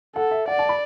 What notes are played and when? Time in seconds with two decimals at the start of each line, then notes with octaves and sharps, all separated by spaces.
0.15 A4 F#5
0.31 E5
0.48 D5 F#5
0.59 A5
0.69 B5